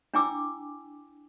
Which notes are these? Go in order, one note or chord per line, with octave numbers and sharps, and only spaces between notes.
D4 E4 G5 G#5 D6 E6